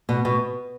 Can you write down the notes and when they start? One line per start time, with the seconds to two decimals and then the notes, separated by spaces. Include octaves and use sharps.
0.09 B2
0.25 B2